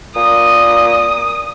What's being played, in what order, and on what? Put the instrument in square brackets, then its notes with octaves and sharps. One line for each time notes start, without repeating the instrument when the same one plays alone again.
[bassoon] A#2 [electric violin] D#6